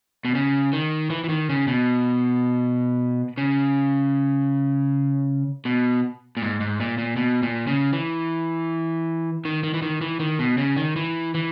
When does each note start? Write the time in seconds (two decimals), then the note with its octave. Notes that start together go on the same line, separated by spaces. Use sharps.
0.25 B2
0.35 C#3
0.73 D#3
1.10 E3
1.24 E3
1.29 D#3
1.49 C#3
1.68 B2
3.38 C#3
5.65 B2
6.37 A#2
6.42 G#2
6.60 G#2
6.80 A#2
6.98 A#2
7.17 B2
7.43 A#2
7.67 C#3
7.93 E3
9.45 D#3
9.64 D#3
9.74 E3
9.82 D#3
10.01 E3
10.20 D#3
10.39 B2
10.58 C#3
10.77 D#3
10.96 E3
11.35 E3